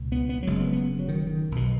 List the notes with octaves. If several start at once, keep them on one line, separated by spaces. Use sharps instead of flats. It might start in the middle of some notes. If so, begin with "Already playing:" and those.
Already playing: C#2 B2
B3
B3
F#3
F#1 F#2 C#3 G#3
B3
B3
F#3
D#3
D#3
B1 B2